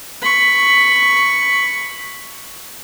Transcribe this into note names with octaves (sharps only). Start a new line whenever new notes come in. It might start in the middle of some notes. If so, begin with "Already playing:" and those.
B5 C#6